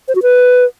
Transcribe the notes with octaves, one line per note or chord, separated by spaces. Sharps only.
C5
F#4
B4